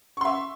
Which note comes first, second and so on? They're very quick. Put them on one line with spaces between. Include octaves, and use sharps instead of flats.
C#6 C6 E5